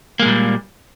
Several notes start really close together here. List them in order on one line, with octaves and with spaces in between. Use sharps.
A#3 G#3 A#2 G3